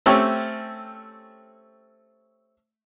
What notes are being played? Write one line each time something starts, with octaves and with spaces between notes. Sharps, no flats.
A3 C4 C#4 G4 C#5